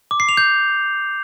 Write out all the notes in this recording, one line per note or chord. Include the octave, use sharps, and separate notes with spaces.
D6
C7
F7
G6